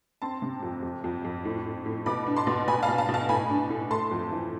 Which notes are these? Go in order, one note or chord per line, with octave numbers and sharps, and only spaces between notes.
C4 A5 C6
C3
F2
F2
F2
F2
A2
A2
A2
B2 B5 D6
D4
A5 C6
B2
B2 G#5 B5
F5 A5
B2
F5 A5
B2
F5 A5
A2 G#5 B5
D4
A2
A3 A5 C6
F2
E3